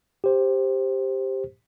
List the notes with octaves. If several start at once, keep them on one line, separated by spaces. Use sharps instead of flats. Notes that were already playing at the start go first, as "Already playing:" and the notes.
G4 C5